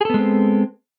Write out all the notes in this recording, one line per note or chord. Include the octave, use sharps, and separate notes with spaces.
G#3 B3 C4 G#4 A4